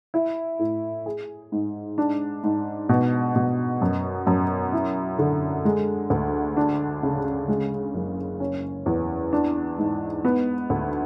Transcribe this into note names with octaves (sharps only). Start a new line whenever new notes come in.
E4
A2
G#4
G#2
D4
G#2
B2
B2
F#2
F#2
E4
D3
G#3
D2
D4
C#3
G#3
F#1
C#4
E2
D4
G#2
B3
D2